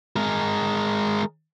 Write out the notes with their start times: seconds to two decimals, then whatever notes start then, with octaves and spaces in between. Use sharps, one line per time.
0.16 G#3 A#4